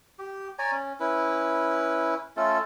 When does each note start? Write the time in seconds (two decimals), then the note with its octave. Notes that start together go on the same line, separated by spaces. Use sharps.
0.19 G4
0.59 C#5 D5 G#5 A#5
0.72 C#4
1.00 C#4 E4 B4
2.37 A3 C#4 F4 A4